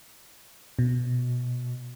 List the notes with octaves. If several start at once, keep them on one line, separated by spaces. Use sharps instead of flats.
B2